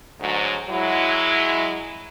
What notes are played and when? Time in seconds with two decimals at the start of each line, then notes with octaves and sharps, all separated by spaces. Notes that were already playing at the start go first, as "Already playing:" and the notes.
0.20 D2 G#2 F#3
0.69 F#3 G#3 E4